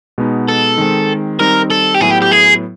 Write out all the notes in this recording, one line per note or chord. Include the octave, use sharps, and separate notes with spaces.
B2 G#3 B3 D#4
A4
D#3 G#3 C4
D#3 G3 C4 D#4 A#4
A4
G4
A2 F#3 B3 E4 G#4
G4
G4
G#4